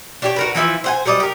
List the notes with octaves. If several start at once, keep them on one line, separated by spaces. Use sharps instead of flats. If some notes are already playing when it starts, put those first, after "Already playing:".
D4 G4 C#5
F#4 A#4 B4
E3 F3 E4 B4
C5 F#5 G#5
F#3 G3 D5 D#5
G4 A#4